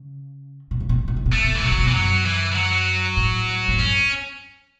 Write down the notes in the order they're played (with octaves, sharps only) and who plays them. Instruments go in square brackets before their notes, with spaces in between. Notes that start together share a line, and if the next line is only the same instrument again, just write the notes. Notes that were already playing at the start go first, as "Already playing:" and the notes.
Already playing: [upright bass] C#3
B2
C#3
B2
C#3
B2
C#3
B2
[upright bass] C#3 [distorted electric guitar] A3
[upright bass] B2
[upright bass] C#3 [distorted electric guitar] E3
[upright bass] B2 [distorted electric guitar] F#3
[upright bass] C#3
B2
[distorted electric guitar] E3
[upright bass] F#2 [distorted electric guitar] F#3
[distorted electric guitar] E3
E3
F#3
[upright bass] A2
A2
[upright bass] F#2 [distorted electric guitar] C#4